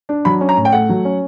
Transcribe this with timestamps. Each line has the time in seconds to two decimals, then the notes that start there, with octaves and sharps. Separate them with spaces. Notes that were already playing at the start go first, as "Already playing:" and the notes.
0.09 D4
0.25 F#3 B5
0.41 C#4
0.49 A#5
0.57 A2
0.65 G5
0.72 A3 F#5
0.89 F#3
1.05 C#4